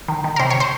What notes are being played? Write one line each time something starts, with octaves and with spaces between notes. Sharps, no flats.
D#3
D#3
A#4
C3 C5
C#5
C5